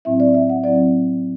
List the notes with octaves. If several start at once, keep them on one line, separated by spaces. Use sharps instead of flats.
A2 F#3 C4 E4 E5
D5
E5
F#5
A2 F#3 C4 E4 D5